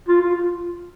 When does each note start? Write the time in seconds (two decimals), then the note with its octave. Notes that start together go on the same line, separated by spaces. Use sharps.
0.08 F4
0.21 F4
0.35 F4